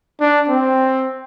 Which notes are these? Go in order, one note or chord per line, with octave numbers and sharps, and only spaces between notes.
D4
C4